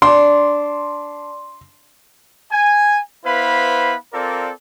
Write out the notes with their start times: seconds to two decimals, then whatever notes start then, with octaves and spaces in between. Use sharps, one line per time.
0.02 D4 C6
2.52 G#5
3.25 B3 E4 B4 C5 F5 B5
4.13 C4 F4 A4 A#4 D5